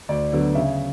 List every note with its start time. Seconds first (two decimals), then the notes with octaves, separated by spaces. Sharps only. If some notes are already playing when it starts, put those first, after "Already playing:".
0.09 D2 D5
0.32 D3 F#3 B3
0.55 C#3 E5